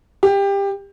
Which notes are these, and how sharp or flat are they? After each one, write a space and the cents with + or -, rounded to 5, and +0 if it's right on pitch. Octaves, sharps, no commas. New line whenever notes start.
G4 +20